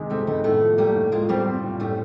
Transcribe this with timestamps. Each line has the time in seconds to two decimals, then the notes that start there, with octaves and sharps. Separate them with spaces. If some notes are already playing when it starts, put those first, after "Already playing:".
Already playing: C3 D#3 G#3
0.10 G3 A3 C4
0.27 D#3 A3 B3
0.44 A2 A3 B3
0.61 F3
0.78 G3 A3 A#3
0.96 A2
1.12 G#3 A#3 F4
1.29 G3 A#3 C4
1.46 C4
1.63 A#2
1.80 A2 G3 A3